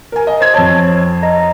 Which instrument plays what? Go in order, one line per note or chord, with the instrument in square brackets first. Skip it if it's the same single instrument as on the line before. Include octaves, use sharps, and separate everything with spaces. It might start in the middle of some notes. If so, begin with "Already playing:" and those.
[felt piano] A#4 G#5
D#5
[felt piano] C5 G#6 [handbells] D#5
[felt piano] F2 C5 A5 [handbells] C#5
[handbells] D#5 A#5